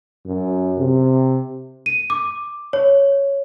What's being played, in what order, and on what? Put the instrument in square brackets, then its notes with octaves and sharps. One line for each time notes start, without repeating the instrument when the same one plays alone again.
[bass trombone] F#2
C3
[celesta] D#7
D6
C#5